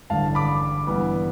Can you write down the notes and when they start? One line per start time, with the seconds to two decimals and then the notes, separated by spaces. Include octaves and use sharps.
0.10 A1 G2 D3 F5 A5
0.35 B5 D6
0.87 G2 E3 B3